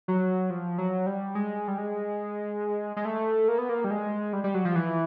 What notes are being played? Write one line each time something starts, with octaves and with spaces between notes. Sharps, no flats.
F#3
F3
F#3
G3
G#3
G3
G#3
G#3
A3
A#3
B3
A#3
G3
G#3
G3
G3
F#3
F3
E3